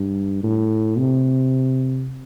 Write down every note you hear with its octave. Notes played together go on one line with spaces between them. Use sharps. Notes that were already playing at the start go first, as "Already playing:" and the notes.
Already playing: G2
A2
C3